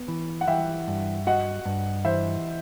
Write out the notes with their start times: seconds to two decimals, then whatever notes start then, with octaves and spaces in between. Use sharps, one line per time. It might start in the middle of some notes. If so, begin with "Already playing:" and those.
Already playing: B3
0.08 E3
0.41 F#5
0.48 E3 E5 G5
0.87 G2
1.27 F#4 D#5 F#5
1.65 G2
2.05 E3 C5 E5